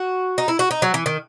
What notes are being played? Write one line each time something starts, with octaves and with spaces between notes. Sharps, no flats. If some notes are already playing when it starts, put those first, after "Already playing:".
Already playing: F#4
D#4
E4
F#4
D#4
F#3
E3
D#3